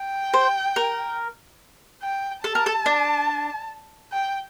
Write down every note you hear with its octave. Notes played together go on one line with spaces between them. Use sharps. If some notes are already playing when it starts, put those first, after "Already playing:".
Already playing: G5
C5
A#4
G5
A4 A5
A#4
A4
D4
G5